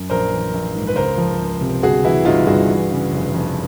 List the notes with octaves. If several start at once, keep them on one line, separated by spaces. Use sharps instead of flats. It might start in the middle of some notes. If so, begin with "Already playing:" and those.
Already playing: F#2
A#1 A#4 C5
E3
A#1
G#2
B4
C#2 A#4 C5
F3
C#2
C3
G1 F#4 G#4
E3 E4 F#4
G1 D#4 F4
G2 F#4 G#4
E3
C#3
F1
F2